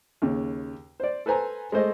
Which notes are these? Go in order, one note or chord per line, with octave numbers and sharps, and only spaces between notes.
D#2 C#3
C5 D5
A4 B4 C5 G#5 A#5
G#3 A3 C5 D#5